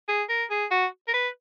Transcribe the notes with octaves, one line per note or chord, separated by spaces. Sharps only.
G#4
A#4
G#4
F#4
A#4
B4